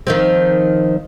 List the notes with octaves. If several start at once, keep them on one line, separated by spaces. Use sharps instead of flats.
D#3 F3 C4